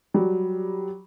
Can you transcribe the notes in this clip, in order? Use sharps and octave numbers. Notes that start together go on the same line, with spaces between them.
F#3 G3